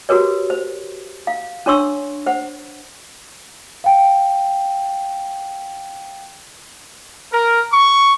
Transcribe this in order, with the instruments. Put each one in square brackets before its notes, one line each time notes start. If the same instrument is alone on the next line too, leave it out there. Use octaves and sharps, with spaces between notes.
[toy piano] F#4 G4 A#4 B4 C#5
C5
F5
C#4 D4 C#5 C6 C#6 E6
C5 F#5
[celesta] F5 G5
[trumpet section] A#4
C#6